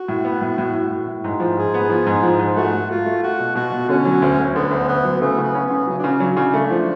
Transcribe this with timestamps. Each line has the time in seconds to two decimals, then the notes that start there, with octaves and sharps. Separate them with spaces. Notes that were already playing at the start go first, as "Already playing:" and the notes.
Already playing: F#4
0.08 A2
0.25 B3
0.41 A2
0.58 A2
0.74 A2
0.91 A2
1.08 A2
1.24 G#2
1.40 F3
1.57 G#2 G#4
1.74 B3
1.90 F3
2.06 G#2
2.23 F3
2.39 G#2
2.56 A3 F#4
2.74 A3
2.90 A3 F4
3.06 A3
3.23 F4 F#4
3.40 B2
3.55 B2 F#4
3.72 B2
3.89 D3 C#4
4.05 F#3
4.22 D2
4.39 D2
4.55 D3 B3
4.71 D2
4.88 D2 B3
5.05 F#3
5.21 C#3 A3
5.38 C#3 B3
5.55 C#4
5.66 C#3 B3
5.87 F#3 C#4
5.98 D4
6.04 C#3 C#4
6.20 F#3 D4
6.37 C#3
6.54 A3
6.70 F3